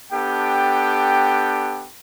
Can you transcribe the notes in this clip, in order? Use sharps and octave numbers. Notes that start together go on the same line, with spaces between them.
B3 D4 G4 A4 G5